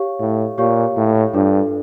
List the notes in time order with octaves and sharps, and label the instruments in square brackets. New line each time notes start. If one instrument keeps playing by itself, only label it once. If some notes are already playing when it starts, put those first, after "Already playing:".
Already playing: [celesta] G4 C#5 F5 C#6
[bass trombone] A2
[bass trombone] A#2 [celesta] G4 C#5 F5 C#6
[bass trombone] A2
[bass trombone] G2 [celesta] D4 F4 A4